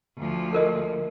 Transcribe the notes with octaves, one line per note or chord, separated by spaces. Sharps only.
D2 F3
A4 A#4 D#5